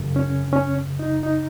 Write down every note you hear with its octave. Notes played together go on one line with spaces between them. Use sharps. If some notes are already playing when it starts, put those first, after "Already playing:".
Already playing: F#2 C#3
C#4
C#4
D#4
D#4